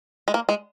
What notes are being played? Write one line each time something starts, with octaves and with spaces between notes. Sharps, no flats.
G#3
A#3
G#3